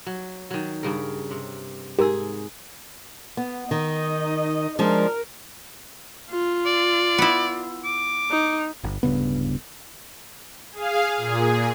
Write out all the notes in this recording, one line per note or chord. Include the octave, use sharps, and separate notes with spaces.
F#3
D#3 F#3
G2 C#3 A#4
C3
G#2 G4 G#4 A#4 E6
B3
D#3 D#4 D#5
F3 G#3 D4 A#4
F4
D5
B3 E4
D6
D#4
G1
D1 G2 C#3 B3
G#4 F5
A#2 G#4